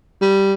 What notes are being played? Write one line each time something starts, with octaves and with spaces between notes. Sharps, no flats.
G3